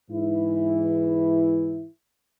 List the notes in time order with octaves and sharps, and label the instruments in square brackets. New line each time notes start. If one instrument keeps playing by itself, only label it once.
[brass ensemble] G#2 E3 E4